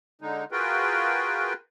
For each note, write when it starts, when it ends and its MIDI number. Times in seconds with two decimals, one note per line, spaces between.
0.21 0.44 50
0.21 0.44 56
0.21 0.44 63
0.52 1.53 65
0.52 1.53 66
0.52 1.53 68
0.52 1.53 70
0.52 1.53 71
0.52 1.53 79